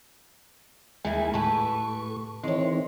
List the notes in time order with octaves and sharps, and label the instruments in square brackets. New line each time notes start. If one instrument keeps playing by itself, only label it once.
[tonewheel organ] D#2 G#3 G#5 [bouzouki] D#3 E3 E4
[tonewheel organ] A2 C#6 [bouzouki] G4 A4 B4
[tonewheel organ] D#3 E3 C4 [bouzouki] G#3 C#5